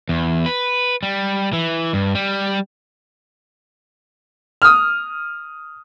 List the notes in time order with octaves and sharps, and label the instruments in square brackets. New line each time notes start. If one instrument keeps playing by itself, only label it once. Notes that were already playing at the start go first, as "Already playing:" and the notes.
[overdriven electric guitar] E2
B4
G3
E3
G2
G3
[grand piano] D#6 F6